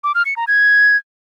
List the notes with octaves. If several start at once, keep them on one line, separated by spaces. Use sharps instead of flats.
D6
F6
C#7
A#5
G#6